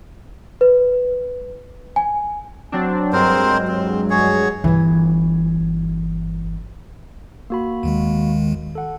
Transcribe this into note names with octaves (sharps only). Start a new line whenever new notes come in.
B4
G#5
F#3 C4 D4
G2 F#3 G#3 C4 A#4 C5
C4
F#4 G#4 C#5
G1 E3
A#3 F#4 B5
D#2 D#3 G#3
A4 F#5